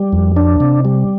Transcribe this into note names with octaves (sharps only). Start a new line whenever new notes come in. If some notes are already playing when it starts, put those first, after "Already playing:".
Already playing: G3
F2
D4
C3
G3